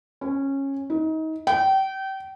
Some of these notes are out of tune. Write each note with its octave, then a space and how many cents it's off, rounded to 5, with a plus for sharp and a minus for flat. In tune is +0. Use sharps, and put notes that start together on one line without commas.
C#4 -15
D#4 +30
G5 -30